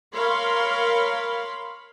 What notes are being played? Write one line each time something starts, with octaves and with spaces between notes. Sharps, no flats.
A#4 C#5 F5 B5 C6